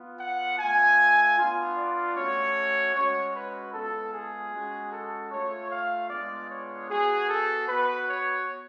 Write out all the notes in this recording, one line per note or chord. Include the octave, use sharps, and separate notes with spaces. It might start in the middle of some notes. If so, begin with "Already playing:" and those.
Already playing: B3 F4
F#5
A3 F4 G#5
B3 D4 F4
D5
A3 C#4 F#4 C#5
G#3 C#4 F#4 C#5
B4
G#3 B3 F4 A4
G#4
G#3 C#4 F#4
A4
A3 F4 C#5
F5
G#3 B3 D4 F4 D5
C#5
B3 F#4 G#4
A4
B3 F#4 B4
C#5